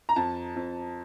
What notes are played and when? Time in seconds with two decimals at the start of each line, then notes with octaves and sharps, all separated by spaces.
0.09 A#5
0.16 F2 A5
0.56 F2